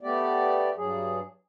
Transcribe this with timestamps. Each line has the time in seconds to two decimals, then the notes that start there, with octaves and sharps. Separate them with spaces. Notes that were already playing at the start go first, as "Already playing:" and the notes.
0.01 A3 B3 G4 D5
0.77 G2 F#3 G#4